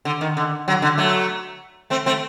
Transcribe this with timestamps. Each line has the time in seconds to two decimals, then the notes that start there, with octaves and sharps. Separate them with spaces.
0.05 D3
0.21 D#3
0.37 D3
0.68 D3 F#3
0.82 D3
0.98 F#3 A3
1.90 A3 C4
2.06 A3 C4